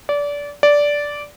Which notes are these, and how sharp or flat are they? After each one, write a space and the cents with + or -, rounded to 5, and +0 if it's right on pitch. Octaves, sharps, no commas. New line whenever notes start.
D5 -25
D5 -10